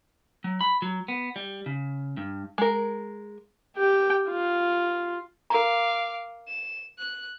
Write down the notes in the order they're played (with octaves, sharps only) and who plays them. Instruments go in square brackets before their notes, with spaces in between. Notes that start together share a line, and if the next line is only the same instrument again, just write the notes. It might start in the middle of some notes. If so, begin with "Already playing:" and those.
[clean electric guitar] F#3
B5
F#3
B3
G3
C#3
G2
[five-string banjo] G#3 A#4
[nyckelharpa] G4 G5
F4
[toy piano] A#4 A#5 [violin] F5 D6
[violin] E7
F#6